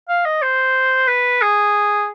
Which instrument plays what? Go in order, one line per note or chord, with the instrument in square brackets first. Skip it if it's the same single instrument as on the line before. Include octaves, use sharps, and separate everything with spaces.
[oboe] F5
D#5
C5
B4
G#4